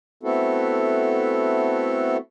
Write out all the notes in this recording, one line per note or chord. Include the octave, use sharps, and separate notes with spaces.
A3 B3 C4 E4 F#4 A4